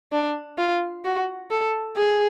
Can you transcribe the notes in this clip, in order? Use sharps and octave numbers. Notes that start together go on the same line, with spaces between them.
D4
F4
F#4
A4
G#4